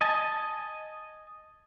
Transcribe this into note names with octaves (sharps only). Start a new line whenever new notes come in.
D#5 G#5 A5